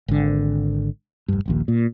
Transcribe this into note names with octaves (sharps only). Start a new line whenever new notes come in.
G#1 D3
F1 G2
D#1 A#1 D#2
A#2